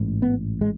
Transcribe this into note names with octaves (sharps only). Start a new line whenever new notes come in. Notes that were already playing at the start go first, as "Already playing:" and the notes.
Already playing: A1 G#2
B3
G#3